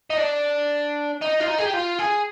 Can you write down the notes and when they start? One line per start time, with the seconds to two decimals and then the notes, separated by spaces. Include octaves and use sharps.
0.10 D#4
0.17 D4
1.21 D#4
1.40 F4
1.48 D#4
1.58 G#4
1.65 G4
1.74 F4
1.99 G#4